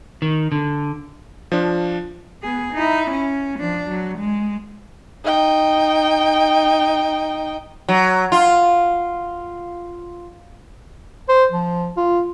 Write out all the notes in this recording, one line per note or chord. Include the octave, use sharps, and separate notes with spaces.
D#3
D3
F3 D4
B3 G#4
D#4 E4
C#4
F3 D4
F#3
G#3
D#4 G5
F#3
F4
C5
F3
F4